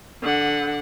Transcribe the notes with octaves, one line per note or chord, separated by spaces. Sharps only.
D3 F#5